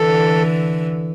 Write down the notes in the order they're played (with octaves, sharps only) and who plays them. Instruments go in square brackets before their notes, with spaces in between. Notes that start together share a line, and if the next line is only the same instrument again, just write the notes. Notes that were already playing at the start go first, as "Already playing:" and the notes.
Already playing: [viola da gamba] D3 E3 [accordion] A4